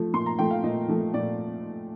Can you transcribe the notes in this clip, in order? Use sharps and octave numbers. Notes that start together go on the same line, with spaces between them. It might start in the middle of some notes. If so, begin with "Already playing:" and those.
Already playing: F3 A3
A#2 C6
A#5
F3 A3 G5
F5
A#2 D#5
F3 A3
A#2 D5